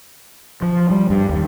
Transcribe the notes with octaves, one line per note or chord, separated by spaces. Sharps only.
F3
G3
G2
D#2